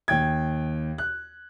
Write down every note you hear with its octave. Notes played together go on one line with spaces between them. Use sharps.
D#2 G5 G#6
F#6